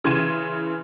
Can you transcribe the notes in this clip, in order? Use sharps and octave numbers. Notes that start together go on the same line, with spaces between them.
C#3 E3 C6 G#6 D#7 E7